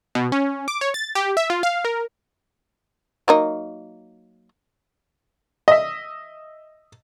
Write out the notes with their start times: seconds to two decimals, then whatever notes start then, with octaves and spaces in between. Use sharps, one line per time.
0.15 B2
0.32 C#4
0.68 D6
0.81 C#5
0.94 A6
1.15 G4
1.37 E5
1.50 F4
1.63 F5
1.85 A#4
3.28 F#3 A#3 D#4
5.68 D#5 E5